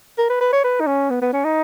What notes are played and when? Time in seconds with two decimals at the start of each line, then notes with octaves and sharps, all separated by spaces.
0.18 A#4
0.30 B4
0.41 B4
0.53 C#5
0.64 B4
0.81 D#4
0.87 C#4
1.10 B3
1.22 B3
1.33 C#4
1.45 D#4